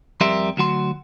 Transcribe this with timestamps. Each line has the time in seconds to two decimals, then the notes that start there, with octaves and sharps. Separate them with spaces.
0.21 F2 G3 G4 A#4 E5 C6
0.57 D2 F#3 F#4 C6